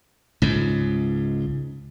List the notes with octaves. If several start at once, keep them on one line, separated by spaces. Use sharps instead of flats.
C#2 G#2